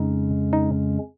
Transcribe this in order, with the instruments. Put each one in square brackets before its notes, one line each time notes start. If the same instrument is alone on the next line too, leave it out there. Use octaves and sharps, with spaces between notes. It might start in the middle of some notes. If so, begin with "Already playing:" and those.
Already playing: [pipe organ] F2 C#3 G#3 C#4 [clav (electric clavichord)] D#4
[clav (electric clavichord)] D#4